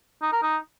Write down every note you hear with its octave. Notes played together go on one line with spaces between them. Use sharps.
D#4
A#4
D#4